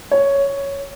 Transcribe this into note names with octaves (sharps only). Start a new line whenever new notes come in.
C#5